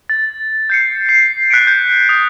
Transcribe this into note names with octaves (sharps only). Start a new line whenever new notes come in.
A6
G6 C7 C#7
C7
F#6 B6 C#7 D7
G6
D#6